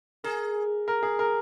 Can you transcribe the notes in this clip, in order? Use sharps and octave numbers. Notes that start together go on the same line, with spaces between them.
G#4 A#4
A#4
G#4
A#4